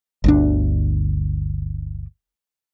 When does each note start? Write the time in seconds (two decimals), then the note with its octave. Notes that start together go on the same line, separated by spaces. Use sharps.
0.24 G1 D2 D4